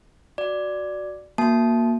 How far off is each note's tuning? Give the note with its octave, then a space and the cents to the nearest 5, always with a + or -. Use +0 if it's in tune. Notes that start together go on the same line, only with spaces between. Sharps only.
F#4 +0 D5 +0
A#3 +10 F#4 -15 A5 -25